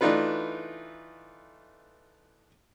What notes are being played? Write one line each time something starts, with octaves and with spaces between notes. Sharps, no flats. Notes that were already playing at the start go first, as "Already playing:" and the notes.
E3 A3 D4 D#4 F4 B4